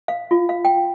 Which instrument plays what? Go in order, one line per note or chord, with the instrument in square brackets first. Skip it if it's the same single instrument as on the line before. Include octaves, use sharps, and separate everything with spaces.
[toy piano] F5
F4
F5
G5